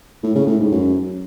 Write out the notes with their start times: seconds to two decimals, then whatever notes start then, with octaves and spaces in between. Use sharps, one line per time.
0.23 A2
0.35 C#3
0.47 A2
0.59 G#2
0.71 F#2